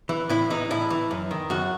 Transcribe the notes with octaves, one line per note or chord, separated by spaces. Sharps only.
E3
A2 E4
E3 D#4
A2 E4
E3
F#2
D#3
F#2 F#4